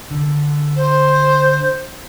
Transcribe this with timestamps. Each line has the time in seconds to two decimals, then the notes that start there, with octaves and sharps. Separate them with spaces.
0.11 D3
0.76 C5